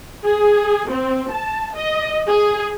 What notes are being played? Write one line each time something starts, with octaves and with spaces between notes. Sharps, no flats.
G#4
C4
A5
D#5
G#4